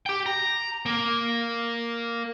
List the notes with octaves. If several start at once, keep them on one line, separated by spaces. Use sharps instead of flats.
G4 G5
A#5
A#3